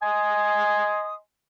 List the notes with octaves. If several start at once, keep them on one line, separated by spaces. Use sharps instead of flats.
D#5 G#5 C6 D#6